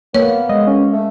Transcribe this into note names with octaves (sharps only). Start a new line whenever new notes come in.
A#3 B3 C#5
G#3 D#5
C#4
A3